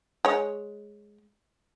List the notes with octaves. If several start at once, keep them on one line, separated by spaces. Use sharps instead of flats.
G#3 C#5